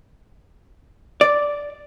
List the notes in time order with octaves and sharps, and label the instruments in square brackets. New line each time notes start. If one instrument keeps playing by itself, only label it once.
[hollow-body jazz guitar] D5